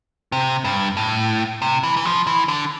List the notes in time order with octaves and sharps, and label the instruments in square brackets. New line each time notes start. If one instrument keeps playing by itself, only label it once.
[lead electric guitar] C3
G2
A2
C3
E3
E3
F3
E3
D3